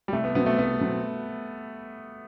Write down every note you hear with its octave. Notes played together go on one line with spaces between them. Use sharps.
G3
C2 A3
B3
B2 F#3 B3 C4
A3
C2 B3
B2 F#3 C4